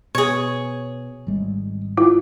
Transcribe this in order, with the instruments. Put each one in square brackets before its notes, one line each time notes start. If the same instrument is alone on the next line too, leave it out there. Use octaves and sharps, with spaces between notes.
[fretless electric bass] B2 [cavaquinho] G#4 C#5
[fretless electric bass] G#1 G3 G#3
[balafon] E4 F4